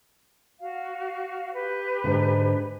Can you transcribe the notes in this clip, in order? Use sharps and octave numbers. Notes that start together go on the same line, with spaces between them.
F#4 F5
G4 B4
G#2 D3